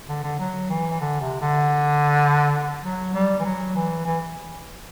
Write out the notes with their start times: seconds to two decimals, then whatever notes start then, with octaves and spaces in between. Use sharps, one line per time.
0.09 D3
0.23 D3
0.39 F#3
0.70 E3
1.01 D3
1.21 C3
1.41 D3
2.84 F#3
3.14 G3
3.40 E3
3.45 F#3
3.75 E3
4.06 E3